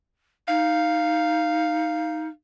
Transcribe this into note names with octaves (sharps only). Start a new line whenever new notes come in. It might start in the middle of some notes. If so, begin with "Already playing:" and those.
D#4 F5